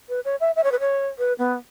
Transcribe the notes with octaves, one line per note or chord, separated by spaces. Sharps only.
B4
C#5
E5
E5
C#5
B4
C#5
B4
B3